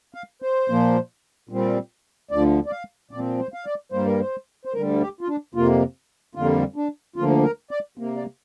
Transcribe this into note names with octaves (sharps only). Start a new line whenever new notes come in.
F5
C5
A#2 F3 A#3
A#2 G3 C4
D2 D3 F3 D5
D5
F5
A#2 F3 C4 D5
C5
F5
D5
G2 G3 A#3 C5
A#4
C5
C5
D2 D3 G3 A#4
G4
F4
D4
F2 C3 A#3 F4
F2 D3 G3 A#3 F4
D4
D2 D3 F3 A#3 F4
A#4
D5
C3 A#3
D5